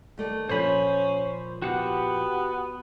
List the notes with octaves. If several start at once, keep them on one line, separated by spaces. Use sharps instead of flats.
D#2 A3 D5
A#2 F3 C#4 F4 C5 B5
B3 F#4 G4 F#5